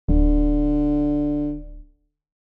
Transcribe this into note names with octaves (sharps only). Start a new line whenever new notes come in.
D1 D3